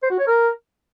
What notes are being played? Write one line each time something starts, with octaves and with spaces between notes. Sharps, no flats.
C5
F#4
C#5
A#4